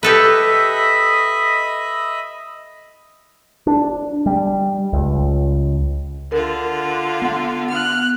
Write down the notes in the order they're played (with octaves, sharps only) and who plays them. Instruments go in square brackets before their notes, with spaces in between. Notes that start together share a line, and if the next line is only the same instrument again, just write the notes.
[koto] G4 A4 B4 [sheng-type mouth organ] D#5 E5 B5
[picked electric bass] D4
G3
C#2
[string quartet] D3 F4 [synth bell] A#4
[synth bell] B3 F#5
[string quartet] F6 F#6